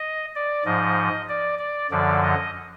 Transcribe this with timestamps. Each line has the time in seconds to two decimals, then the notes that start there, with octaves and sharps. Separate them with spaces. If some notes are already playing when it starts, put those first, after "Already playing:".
Already playing: D#5
0.35 D5
0.65 G#2 F3 D#5
1.29 D5
1.59 D5
1.90 F#2 D3 F3 D5
2.22 D#5